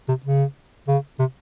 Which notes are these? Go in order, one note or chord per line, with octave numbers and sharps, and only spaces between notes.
C3
C#3
C#3
C3